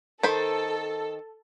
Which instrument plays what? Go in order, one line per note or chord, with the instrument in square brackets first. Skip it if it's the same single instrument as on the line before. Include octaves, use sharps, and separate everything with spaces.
[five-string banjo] D#3 C5 B5 [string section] A4